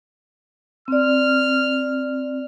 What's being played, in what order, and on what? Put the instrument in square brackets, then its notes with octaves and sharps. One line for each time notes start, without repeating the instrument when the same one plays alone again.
[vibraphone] C4 D5 [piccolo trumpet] F6